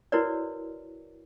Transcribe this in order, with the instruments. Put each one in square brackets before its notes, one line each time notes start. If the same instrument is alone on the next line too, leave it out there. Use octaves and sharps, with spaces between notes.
[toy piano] E4 F#4 A#4 B4 C#5 D5